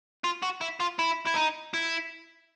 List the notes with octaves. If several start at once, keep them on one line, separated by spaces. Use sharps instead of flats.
F4
F#4
E4
F4
E4
E4
D#4
E4